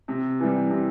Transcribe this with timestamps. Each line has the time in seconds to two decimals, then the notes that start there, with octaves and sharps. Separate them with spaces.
0.08 C3
0.40 E3 G3
0.70 C3